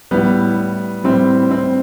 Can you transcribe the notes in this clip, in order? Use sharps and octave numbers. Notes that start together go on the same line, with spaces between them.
A2 G3 B3
A2 G3 C4
C4